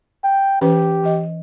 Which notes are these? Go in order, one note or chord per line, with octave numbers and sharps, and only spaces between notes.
G5
E3 C#4 G4 B4
E3 D#5